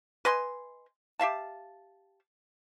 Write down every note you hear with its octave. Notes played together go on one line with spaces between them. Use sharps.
B4 D#5 G#5 C6
G4 E5 F5 A5